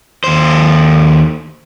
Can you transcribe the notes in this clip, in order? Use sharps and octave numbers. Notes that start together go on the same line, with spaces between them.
D#2 C5